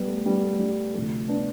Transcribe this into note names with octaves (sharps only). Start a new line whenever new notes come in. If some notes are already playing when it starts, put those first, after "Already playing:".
Already playing: G3 B3
A3
G3 B3
A3
G3
D2 C3 F3 A3
B3 D4